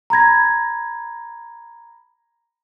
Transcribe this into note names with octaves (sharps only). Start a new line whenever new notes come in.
A#5 B5 G#6 A#6